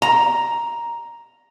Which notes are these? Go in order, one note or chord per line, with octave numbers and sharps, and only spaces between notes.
A#5